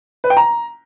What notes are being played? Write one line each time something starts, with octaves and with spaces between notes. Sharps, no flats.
B4
G5
A#5